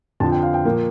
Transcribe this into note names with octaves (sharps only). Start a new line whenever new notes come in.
F2 D3 F3 A5
G5
F5
G5
A#2 F3 A#3